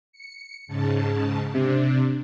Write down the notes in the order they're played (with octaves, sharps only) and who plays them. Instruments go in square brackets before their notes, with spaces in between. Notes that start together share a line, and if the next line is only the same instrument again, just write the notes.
[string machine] C#7
G#2 C#3 A5
[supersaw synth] C3 [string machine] D4